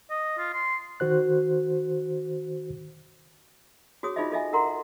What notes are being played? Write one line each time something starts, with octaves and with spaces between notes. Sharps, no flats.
D#5
F4
C6
D#3 F#4 C5 F#6
F#4 G#4 C#5 D#6
D#4 F4 G#4 C5 D#5 E5
F4 A4 D#5 E5 G#5
A4 A#4 F#5 A#5 C6